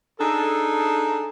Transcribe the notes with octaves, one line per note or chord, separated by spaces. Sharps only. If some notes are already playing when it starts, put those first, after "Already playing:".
D4 D#4 G#4 A4